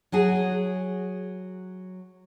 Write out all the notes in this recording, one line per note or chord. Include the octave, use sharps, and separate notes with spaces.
F#3 F#4 G#4